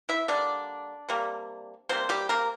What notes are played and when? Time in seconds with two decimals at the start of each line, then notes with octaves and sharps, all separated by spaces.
0.09 E4 E5
0.28 D3 G3 A#3 D4 D5
1.09 C3 G3 A#3
1.89 C3 G3 A#3 C4 C5
2.09 G3 G4
2.29 A#3 A#4